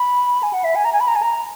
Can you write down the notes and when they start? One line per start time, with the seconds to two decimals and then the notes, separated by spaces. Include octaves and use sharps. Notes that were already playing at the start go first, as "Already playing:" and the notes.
Already playing: B5
0.43 G#5
0.53 F#5
0.64 E5
0.75 G#5
0.85 A#5
0.93 G#5
1.00 B5
1.08 A#5
1.16 G#5
1.22 A#5